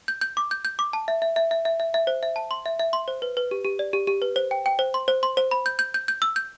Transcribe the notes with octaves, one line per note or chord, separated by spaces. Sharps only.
G6
G6
D6
G6
G6
D6
A5
E5
E5
E5
E5
E5
E5
E5
C5
E5
A5
C6
E5
E5
C6
C5
B4
B4
G4
G4
D5
G4
G4
B4
C5
G5
G5
C5
C6
C5
C6
C5
B5
G6
G6
G6
G6
E6
G6